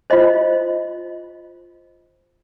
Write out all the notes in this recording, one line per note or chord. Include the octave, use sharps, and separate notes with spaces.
F4 C5 D#5